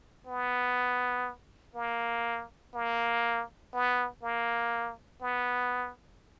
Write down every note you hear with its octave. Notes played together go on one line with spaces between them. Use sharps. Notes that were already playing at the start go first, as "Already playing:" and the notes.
B3
A#3
A#3
B3
A#3
B3